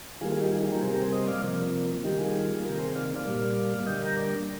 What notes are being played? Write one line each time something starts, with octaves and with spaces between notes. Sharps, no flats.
D#3 G3 A#3 F4 G#4
F4 G#4
D#4 G4
F4 G#4
F4 G#4
G4 A#4
C3 G3 A#3 G#4 C5
G4 A#4
G#4 C5
C5 D#5
D5 F5
C3 F3 A#3
D#3 G3 A#3 D#4 G4
F4 G#4
C3 D#3 A#3 G4 A#4
G#4 C5
D5 F5
D5 F5
A#2 G3 A#3
D3 G3 A#3 D#5 G5
G5 A#5
A#4 D5